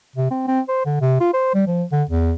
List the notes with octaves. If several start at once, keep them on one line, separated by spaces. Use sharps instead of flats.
C3
C4
C4
C5
D3
C3
F4
C5
G3
F3
D3
E2